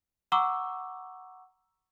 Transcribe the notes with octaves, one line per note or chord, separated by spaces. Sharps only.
F#5 A#5 C#6 D6 E6